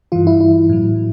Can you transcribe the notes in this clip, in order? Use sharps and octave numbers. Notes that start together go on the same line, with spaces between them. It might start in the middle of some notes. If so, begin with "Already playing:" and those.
G2 E3 F4
E4
E4
A2 F#3